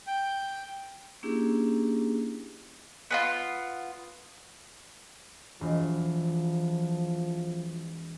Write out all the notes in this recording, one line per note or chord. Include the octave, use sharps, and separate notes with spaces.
G5
A#3 C#4 D4 E4 G4 G#4
B3 D4 F4
E1 F3